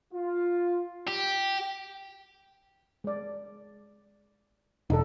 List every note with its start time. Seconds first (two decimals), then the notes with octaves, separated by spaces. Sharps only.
0.14 F4
1.08 G4
3.04 G#3 D5
4.90 E1 D#4 A4